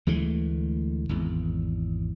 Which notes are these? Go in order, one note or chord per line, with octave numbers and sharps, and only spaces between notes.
D2 E3 G#3 A3
G#1 E2